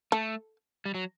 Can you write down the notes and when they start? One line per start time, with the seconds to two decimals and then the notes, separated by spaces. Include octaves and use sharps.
0.12 A3 A4
0.85 G3
0.94 F#3